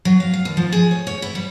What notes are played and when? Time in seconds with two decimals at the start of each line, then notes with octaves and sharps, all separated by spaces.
0.05 F#3
0.20 F5
0.33 F5
0.45 D#2
0.57 F3
0.72 G#4
0.91 C#5
1.07 C#5
1.22 E4
1.35 G3